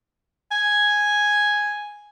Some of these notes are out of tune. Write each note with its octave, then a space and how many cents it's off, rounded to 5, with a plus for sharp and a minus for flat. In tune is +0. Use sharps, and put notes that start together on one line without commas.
G#5 +0